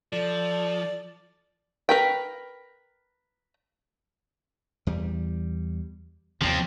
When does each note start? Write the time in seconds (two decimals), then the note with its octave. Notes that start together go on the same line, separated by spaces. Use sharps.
0.13 F3 A4 D5
1.89 A#4 B4 G5
4.87 E2 G3
6.41 D#2 C3 F3 C4